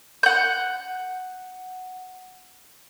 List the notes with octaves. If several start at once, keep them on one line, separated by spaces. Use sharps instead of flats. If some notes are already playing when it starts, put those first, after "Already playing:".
F#5 G6